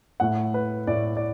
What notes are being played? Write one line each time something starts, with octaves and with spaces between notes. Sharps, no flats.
A2 A3 F#5
B4
A2 A3 D5
D5